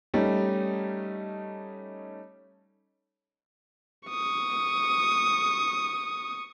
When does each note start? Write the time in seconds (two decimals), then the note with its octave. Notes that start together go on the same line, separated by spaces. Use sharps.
0.14 G3 A3 C#4 D#4
4.09 C#6 D#6